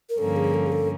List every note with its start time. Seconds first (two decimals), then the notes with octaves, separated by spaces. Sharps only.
0.10 A#4
0.18 G2 D3 F3 A#3 C#4 A4
0.36 G#4
0.54 A4
0.66 G#4
0.72 A4